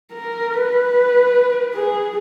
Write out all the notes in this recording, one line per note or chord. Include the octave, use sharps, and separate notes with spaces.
A#4
B4
G#4